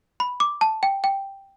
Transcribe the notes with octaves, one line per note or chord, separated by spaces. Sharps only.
B5
D6
A5
G5
G5